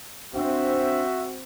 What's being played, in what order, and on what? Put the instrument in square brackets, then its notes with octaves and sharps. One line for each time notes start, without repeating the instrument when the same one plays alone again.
[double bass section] C4 [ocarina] D4 [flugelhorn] F#4 [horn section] E5